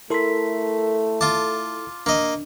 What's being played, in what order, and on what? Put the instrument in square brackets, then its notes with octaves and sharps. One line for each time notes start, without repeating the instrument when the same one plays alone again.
[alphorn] A3 [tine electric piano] E4 A4 C6 [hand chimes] A#4 B6
[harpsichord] F4 A5 [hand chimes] D6
[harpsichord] A#3 D#5 [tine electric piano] D4